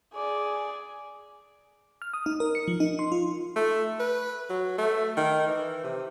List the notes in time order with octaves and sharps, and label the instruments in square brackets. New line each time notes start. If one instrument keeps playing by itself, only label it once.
[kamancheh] G#4 D5
[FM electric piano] F6
D#6
D#4
A#4
C#7
F3
D#4
C6
F4
[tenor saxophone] A3
B4
F#3
A3
D#3
E3
C3